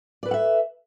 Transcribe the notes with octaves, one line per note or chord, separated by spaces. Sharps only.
A4 B4 D5 E5 F#5